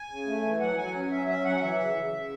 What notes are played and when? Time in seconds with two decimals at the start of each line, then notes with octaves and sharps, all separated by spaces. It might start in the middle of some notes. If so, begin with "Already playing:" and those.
Already playing: G#5
0.09 C#3
0.27 A3
0.44 E3
0.60 F#3 F#5
0.77 F#3 G#5
0.94 C#4
1.11 F#3 E5
1.28 C#4 E5
1.45 F#3 F#5
1.62 E3 E5
1.79 C#3
1.95 C#3
2.13 C#3